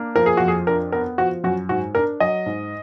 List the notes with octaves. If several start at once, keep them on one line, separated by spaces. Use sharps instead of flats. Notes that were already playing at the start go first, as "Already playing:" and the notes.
Already playing: A#3 D4
F3 A#4
G#4
F2 F#4
G#4
D4 A#4
B3 A#4
F3 F#4
F#2 F#4
G#2 F#4
D4 A#4
F#3 D#5
G#2